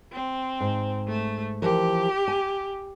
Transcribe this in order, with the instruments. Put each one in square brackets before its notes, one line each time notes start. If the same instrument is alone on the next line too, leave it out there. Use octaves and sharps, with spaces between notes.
[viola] C4
[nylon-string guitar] G#2
[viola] A3
[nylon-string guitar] E3 F3 A#4 [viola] G4
[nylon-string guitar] G#5